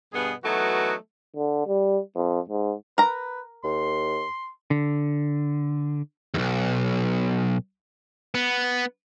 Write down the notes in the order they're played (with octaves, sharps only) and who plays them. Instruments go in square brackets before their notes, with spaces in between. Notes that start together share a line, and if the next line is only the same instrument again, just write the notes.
[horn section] G2 B2 B3 G#4
E3 F#3 A3 B3 D#4 F#4
[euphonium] D3
G3
F2
G#2
[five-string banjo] A#4 A#5 [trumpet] B4
[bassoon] D#2 [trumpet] C6
[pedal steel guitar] D3
[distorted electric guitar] B1 E2
B3